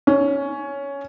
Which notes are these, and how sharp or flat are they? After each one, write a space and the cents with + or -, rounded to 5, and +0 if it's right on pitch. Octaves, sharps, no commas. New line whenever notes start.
C#4 +10